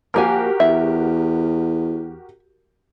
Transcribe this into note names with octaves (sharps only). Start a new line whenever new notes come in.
F3 A#3 F#4 G4 A#4 G#5
E2 E5